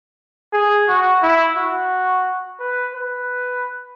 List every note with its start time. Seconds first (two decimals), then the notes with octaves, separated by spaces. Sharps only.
0.53 G#4
0.88 F#4
1.23 E4
1.57 F#4
2.60 B4
2.94 B4